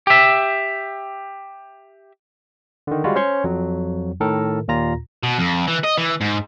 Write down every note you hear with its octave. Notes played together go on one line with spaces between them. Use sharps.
G4 E5
D3 D#3
G3 G#3 F4 F#4
C#4 C5 C#5 C6 C#6
F2 F#3
A2 D#3 A4 A#4
D#2 A#2 F4 A#5 A#6
B2
F2
E3
D#5
E3
G#2